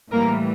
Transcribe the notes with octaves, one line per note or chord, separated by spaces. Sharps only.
A2 E3 G3 A#3 A#4